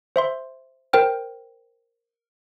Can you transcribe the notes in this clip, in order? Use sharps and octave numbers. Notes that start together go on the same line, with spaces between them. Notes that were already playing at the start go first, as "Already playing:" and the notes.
C5 E5 C6
A#4 C5 G5 F6